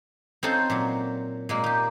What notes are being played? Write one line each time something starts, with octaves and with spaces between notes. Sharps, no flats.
C4 C#4 D#4 F4 A4 C5
A#2 F#3
A#2 G#3 A#3
D#4 G4